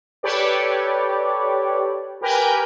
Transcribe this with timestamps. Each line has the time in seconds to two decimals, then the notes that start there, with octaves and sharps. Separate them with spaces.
0.23 G4 A4 B4 C#5 D5
2.21 G4 A#4 B4 G5 G#5